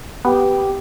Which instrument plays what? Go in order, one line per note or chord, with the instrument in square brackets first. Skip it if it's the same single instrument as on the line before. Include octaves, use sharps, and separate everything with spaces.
[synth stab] B3 [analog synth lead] G4